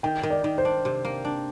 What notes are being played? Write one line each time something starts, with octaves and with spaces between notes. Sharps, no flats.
D#3 G5
D#3
D5
D#3
C5
D4
C3
A#3
D4